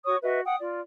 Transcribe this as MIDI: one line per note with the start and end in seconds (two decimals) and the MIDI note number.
0.06 0.17 66
0.06 0.17 73
0.06 0.17 85
0.06 0.17 87
0.22 0.41 66
0.22 0.41 71
0.22 0.41 75
0.22 0.41 76
0.46 0.56 78
0.46 0.56 79
0.46 0.56 87
0.60 0.80 65
0.60 0.80 74